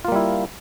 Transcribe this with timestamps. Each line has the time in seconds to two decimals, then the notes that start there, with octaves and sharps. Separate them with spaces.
0.05 F4
0.08 A#3
0.12 G3
0.16 E4